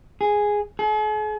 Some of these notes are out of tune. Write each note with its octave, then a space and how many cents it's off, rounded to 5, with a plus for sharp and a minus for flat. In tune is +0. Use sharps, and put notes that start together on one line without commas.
G#4 -5
G#4 +45